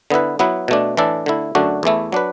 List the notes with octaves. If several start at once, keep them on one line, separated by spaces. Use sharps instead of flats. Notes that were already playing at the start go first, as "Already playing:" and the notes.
D3 B3 E4 B4
F#3 B3 E4 B4
B2 A3 D4
A2 E3 D4 A4
D3 A3 E4
F#2 D3 A3 D4 F#4
E2 E3 A3 E4
F#3 D4 B4